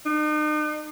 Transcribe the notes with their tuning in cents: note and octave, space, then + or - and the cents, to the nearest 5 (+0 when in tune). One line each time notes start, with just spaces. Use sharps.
D#4 -45